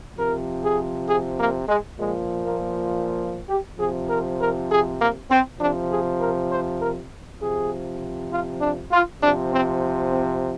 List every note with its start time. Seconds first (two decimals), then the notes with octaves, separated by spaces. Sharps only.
0.18 C3 F3 A#4
0.63 G#4
1.07 G#4
1.39 A#3
1.68 G#3
1.98 A#2 F3 G#3
2.44 A#3
3.49 G4
3.79 C3 F3 G#4
4.09 A#4
4.40 A#4
4.70 G#4
5.00 A#3
5.30 C4
5.60 C3 F3 D4
5.90 G#4
6.20 A#4
6.51 C5
6.81 A#4
7.41 C3 F3 G#4
8.32 F4
8.61 D4
8.91 F4
9.22 C3 F3 D4
9.52 C4
10.11 C4